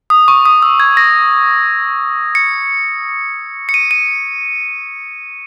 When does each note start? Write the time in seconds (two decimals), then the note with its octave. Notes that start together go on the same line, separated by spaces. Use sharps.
0.10 D#6
0.28 C#6
0.46 D#6
0.62 E6
0.80 G#6
0.97 A#6
2.35 C#7
3.69 C#7
3.74 D#7
3.91 D#7